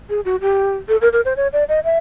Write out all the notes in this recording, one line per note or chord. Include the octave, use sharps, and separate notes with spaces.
G#4
F#4
G4
A4
A#4
A#4
C5
C#5
D5
D#5
E5